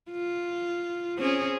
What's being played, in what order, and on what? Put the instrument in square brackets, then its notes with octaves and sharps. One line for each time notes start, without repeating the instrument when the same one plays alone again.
[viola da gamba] F4
C4 C#4 G#4